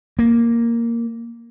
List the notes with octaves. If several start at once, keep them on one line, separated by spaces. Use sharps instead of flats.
A#3